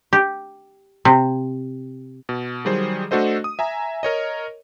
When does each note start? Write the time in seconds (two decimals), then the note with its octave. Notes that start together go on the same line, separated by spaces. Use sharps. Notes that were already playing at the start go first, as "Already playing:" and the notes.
0.13 G4
1.05 C3
2.29 B2
2.65 D#3 F#3 G3 G#4 C5
3.11 A3 D4 F#4 A4 C5 D#5
3.44 D#6
3.59 E5 G#5 A#5
4.03 A#4 C#5 D#5